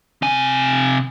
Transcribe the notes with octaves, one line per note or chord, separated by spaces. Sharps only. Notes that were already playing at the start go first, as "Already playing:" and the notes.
C3 G#5